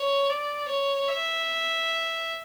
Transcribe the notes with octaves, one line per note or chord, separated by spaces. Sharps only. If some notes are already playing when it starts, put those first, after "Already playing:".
Already playing: C#5
D5
C#5
E5